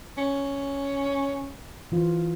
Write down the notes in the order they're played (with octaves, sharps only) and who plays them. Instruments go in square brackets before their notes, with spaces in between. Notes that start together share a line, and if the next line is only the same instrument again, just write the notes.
[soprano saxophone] C#4
[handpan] E3 F4